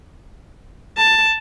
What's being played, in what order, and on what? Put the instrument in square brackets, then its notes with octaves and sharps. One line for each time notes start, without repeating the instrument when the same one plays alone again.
[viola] A5